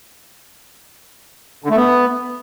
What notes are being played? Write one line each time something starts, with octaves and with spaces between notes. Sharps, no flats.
D3
A3
B3